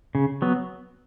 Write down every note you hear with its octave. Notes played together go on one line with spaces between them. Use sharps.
C#3
F#3 B3